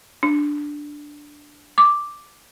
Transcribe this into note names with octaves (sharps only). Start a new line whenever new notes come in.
D4
D6